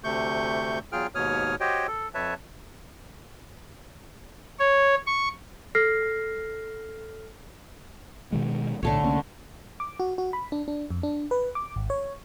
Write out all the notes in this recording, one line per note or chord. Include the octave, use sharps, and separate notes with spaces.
D2 C3 A3 C#6 G6
E2 F#3 F4 G#4 G5 F6
D#2 G#2 B2 C#5 D#6 F6
F#4 G4 C5 C#5 D#5 G5
A4
F2 B4 C#5 E5 A5
C#5
C#6
A4 F6 A#6 C7
B2 D#3 G#3
B1 A2 D3 A3 C#5
C2 A#3 C#4
D6
F#4
F#4
B5
D4
D4
F2
D4
B4
D6
G#1
C#5